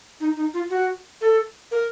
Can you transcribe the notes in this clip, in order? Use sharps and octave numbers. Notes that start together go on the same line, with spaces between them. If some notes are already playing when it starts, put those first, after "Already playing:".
D#4
D#4
F4
F#4
A4
A#4